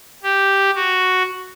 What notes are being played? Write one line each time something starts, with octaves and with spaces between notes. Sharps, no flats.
G4
F#4